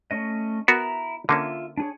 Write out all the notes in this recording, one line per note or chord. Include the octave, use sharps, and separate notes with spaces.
A3 C#4 D#5
B3 E4 F#4 A#4 A#5 B5
D3 A#3 C#4 F4 E5
D4 G#4 C#5